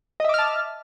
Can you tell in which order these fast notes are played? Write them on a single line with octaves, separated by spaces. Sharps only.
D#5 E5 D6 F6 A5